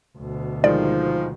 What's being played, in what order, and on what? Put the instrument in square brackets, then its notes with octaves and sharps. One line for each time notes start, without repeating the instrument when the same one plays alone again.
[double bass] D2 B2
[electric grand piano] D#3 G#3 D#4 [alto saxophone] F3 [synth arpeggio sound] D5